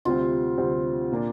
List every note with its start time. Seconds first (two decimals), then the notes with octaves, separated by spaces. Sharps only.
0.05 D2 C3 G3 C4 F4
0.58 D2 C3 G3 C4
1.12 A#2 A#3 D4